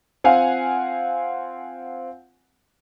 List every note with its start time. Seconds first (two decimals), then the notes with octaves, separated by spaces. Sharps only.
0.24 C4 F4 F5 F#5 G#5